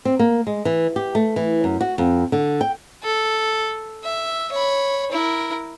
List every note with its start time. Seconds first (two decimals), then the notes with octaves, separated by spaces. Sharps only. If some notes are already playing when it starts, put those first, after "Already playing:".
0.05 C4
0.19 A#3
0.47 G#3
0.65 E3
0.96 G4
1.15 A3
1.36 E3
1.64 F#2
1.81 F#4
1.98 F2
2.32 D3
2.61 G5
3.03 A4
4.04 E5
4.52 C#5 B5
5.11 E4 A#4